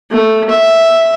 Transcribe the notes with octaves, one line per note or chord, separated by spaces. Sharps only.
A3
E5